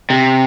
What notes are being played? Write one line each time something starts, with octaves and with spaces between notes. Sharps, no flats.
C3